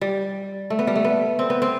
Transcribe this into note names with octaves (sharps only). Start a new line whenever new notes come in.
G3
A3
B3
G3
A3
B3
C4
B3
C4